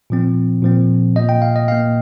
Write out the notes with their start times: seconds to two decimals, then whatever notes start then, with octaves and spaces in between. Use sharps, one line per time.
0.10 A#2 F3 C4
0.62 A#2 F3 C4
1.16 A#2 A#3 D#5
1.29 G5
1.42 F5
1.56 D#5
1.68 A#2 A#3 F5